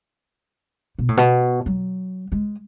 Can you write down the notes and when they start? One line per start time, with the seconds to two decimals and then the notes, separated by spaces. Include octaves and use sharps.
0.99 B2
1.09 A2
1.17 B2
1.66 F#3
2.32 G#3